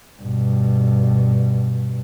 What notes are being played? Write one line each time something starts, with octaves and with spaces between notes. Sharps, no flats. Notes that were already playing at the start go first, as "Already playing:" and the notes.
G2 B2